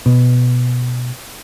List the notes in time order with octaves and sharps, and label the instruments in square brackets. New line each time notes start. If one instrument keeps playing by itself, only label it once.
[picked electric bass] B2